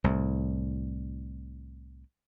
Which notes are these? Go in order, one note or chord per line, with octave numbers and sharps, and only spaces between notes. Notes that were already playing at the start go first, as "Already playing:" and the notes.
C2 A2